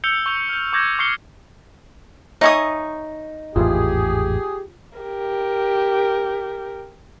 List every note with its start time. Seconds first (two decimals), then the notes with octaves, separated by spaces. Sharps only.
0.04 E6 G6 C#7 F7 G7
0.26 C#6 G6 F7 G7
0.49 F6 G6
0.73 C#6 D6 E6 G6 G#6 A#6
0.99 C#6 D6 F6 C7 C#7 G7
2.41 D#4 C#5 E5 G#5 C#6 D#6
3.56 G#1 E2 A2 F4 G4 G#4
4.99 G4 A#4